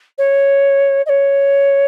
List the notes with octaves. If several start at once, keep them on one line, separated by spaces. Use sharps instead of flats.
C#5
D#5
C#5